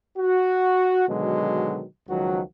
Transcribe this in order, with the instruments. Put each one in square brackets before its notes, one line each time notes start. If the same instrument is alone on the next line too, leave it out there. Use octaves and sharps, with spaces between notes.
[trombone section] F#4
B2 D3 D#3 F#3 G#3
C#2 D#3 F3 F#3 F#4